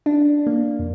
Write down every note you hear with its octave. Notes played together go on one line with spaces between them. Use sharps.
D4
A#3
F2